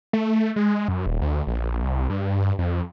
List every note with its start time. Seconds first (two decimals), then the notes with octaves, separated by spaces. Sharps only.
0.13 A3
0.56 G#3
0.88 F#2
1.06 D#1
1.22 D2
1.47 A#1
1.82 C2
2.10 G2
2.59 F2